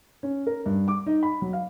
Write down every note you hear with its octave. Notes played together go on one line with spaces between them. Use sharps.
C#4
A#4
G2
D6
D#4
B5
F#3
F5